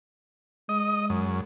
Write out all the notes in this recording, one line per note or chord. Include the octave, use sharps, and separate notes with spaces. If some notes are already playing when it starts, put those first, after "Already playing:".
G#3 D#5 D#6
F#2